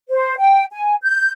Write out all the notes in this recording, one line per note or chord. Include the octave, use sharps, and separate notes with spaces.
C5
G5
G#5
G6